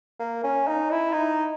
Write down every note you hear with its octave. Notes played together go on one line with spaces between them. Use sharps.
A#3
C#4
D#4
E4
D#4